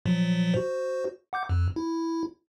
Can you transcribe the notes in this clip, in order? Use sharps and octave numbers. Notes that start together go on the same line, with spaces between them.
A#2 F3 F#3
F#4 C5
F#5 D6 G6
F2
E4